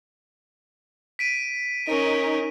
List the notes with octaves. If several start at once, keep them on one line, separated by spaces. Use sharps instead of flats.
B6 D7 D#7
C#4 D#4 A#4